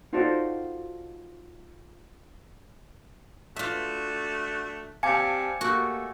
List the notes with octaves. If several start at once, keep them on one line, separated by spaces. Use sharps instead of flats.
D#4 F4 F#4 A4 C5 D5
A3 D4 F4 F#4 E5
G3 C4 F5 G#5 A5 D6 G#6 C#7
G3 A3 A#3 F#4